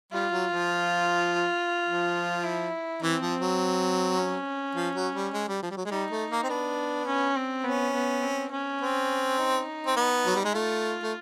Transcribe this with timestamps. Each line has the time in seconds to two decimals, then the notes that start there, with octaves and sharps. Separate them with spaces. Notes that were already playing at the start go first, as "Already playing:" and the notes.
0.12 G3 F4
0.31 F#3
0.51 F3
1.87 F3
2.44 E4
3.02 E3 C4
3.21 F3
3.41 F#3
4.17 C#4
4.75 F3
4.95 F#3
5.15 G3
5.33 G#3
5.48 G3
5.63 F3
5.70 G3
5.77 F#3
5.85 G#3
5.91 G3 D#4
6.11 A3
6.30 A#3
6.43 C4
6.49 B3 D4
7.07 C#4
7.36 C4
7.65 B3 C#4
7.94 B3
8.23 C4
8.51 C#4
8.81 C4
9.39 D#4
9.86 C4
9.96 B3
10.26 F#3
10.36 G3
10.45 G#3
10.54 A3 F4
11.03 A3